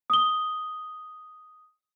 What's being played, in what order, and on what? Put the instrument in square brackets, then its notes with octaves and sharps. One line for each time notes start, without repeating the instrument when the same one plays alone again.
[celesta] D#6 G7